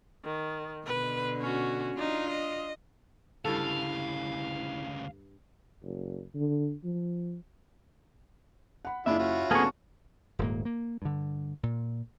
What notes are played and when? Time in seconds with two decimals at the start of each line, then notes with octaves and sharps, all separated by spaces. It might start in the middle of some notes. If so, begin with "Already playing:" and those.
0.25 D#3
0.86 B2 D3 B4
1.40 C#4 F#4
1.98 D4 D#4 F4
2.31 D#5
3.45 D2 G2 C#3 E4 A4 F5
5.83 F#1
6.35 D3
6.84 F3
8.85 F#5 B5
9.06 F#1 G#3 D4 E4 F4 E5 B5
9.19 C#4 F4 F#4
9.51 C2 D3 A#3 B3 G#4 A5 C#6
10.39 D#1 G#2 A#3
10.65 A#3
11.02 G2 D3
11.63 A#2